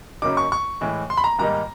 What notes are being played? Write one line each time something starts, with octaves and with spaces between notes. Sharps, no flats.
F#2 C#3 F#3 A#3 D#4 D6
C#6
C#6
A2 E3 G#3
C6
B5
A#5
G#2 D#3 G3 A#3 D#4 A#5